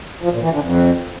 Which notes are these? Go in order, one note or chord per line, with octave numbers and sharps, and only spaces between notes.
F3
A#2
E3
D3
F2